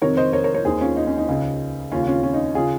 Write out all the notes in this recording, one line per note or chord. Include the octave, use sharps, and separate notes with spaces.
F2 C3 D#3 A#4 C#5
C5 D#5
A#4 C#5
A#4 C#5
A#4 C#5
D#2 D#3 G#4 C5
C#4 F4
D#4
C#4
D#4
C#2 C#3
D#2 C#3 C#4 F4
C#4 F4
C#4 F4
D#4
C#3 F4 G#4